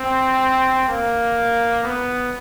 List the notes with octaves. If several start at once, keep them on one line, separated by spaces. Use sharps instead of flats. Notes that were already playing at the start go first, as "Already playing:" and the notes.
Already playing: C4
A#3
B3